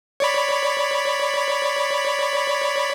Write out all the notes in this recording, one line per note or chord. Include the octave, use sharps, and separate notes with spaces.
C#5 D5 B5